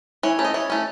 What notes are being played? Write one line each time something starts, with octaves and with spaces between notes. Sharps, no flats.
E3 C#5
A3 C#4
D#5
E3 C#5
A3 C#4